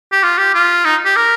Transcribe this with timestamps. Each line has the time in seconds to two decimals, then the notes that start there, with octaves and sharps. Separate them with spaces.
0.12 G4
0.24 F4
0.38 G4
0.54 F4
0.85 D#4
1.05 G4
1.16 A#4